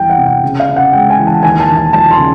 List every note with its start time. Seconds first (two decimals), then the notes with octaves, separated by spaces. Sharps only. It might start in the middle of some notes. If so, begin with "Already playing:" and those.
Already playing: E2 E3 G3 G5
0.10 F#5
0.18 C3
0.26 G5
0.43 C#3
0.60 F5
0.69 C#3
0.76 F#5
0.93 G#3 G5
1.10 G#5
1.18 E3
1.27 A5
1.43 D#2 G#5
1.60 A5
1.69 D#2
1.77 A5
1.93 F3 A5
2.11 C6
2.18 C#3